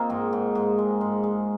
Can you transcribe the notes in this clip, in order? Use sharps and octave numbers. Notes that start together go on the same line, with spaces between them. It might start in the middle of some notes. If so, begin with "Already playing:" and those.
Already playing: A#3 C4 D#4 F4
G#2 A#4 D#5
G#2
G#2
G#3
G#2
G#3